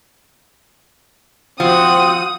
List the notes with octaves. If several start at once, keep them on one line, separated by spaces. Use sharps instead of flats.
F3 C4 F#4 F#5 D#6